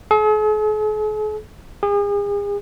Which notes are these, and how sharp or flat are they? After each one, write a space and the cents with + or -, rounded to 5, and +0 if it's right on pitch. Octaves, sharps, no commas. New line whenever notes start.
G#4 +45
G#4 -40